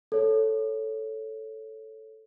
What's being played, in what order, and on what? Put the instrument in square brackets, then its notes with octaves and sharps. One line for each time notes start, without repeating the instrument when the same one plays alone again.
[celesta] A4 C#5